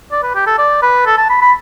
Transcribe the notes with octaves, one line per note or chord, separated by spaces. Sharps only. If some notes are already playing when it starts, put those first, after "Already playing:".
D5
B4
G4
A4
D5
B4
A4
A5
B5
B5